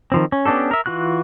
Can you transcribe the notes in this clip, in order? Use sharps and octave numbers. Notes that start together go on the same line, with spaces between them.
D#3 F3 C4
C#4
B3 C#4 D4 G4 A4
A#4 E5
E3 F4 F#4 F#6